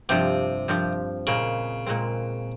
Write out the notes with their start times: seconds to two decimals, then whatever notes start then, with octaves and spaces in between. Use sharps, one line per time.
0.09 G2 C3 F3 C4 G4
0.68 G2 F3 C4 G4
1.27 A#2 C#3 G#3 C4
1.86 A#2 G#3 C4